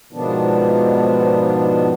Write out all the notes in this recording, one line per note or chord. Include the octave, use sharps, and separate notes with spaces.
G#2 B2 D#3 F3 B3 D4